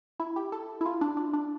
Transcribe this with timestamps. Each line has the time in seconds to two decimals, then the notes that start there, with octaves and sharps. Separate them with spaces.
0.20 E4
0.36 G4
0.52 A4
0.81 E4
0.86 F4
1.01 D4
1.17 D4
1.33 D4